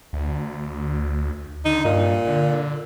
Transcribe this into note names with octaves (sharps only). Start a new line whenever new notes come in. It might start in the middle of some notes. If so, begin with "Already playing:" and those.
D2
D3 D#4
G2 A#2
D3